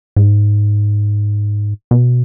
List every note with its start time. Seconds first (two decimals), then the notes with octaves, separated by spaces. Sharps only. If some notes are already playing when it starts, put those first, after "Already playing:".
0.17 G#2
1.91 B2